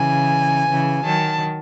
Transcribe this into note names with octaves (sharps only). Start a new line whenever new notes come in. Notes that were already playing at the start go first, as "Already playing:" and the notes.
Already playing: C#3 E3 G#5
C#3 E3
D#3 F#3 A5